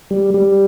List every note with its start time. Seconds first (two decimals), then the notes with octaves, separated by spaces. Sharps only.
0.10 G3
0.34 G3